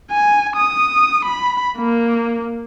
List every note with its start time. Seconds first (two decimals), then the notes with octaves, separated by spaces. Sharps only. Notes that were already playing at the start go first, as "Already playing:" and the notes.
0.11 G#5
0.56 D#6
1.25 B5
1.79 A#3